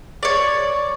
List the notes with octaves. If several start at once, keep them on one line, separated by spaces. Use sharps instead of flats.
C#5 D5